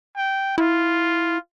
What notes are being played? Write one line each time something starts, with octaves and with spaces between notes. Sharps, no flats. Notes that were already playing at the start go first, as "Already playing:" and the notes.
G5
E4 F4